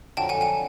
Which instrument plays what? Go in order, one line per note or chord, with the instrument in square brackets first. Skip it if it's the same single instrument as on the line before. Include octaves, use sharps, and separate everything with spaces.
[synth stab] F2 D3 F#3 [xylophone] G5 A5
[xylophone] F#5 G#5
F#5 G#5